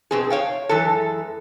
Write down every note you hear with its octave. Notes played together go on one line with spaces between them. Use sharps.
B2 C4 G#4
C#5 F5 G5
F#2 E3 G#3 A4